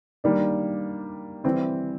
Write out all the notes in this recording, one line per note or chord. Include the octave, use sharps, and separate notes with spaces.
D#3 G3 A#3 D4
E3 G3 C4 E4